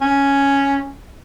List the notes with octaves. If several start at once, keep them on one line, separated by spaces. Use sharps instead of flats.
C#4